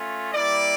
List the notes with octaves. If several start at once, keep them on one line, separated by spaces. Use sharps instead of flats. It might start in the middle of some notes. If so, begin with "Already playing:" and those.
Already playing: A3 C#4 F4
G3 A#3 E4 D5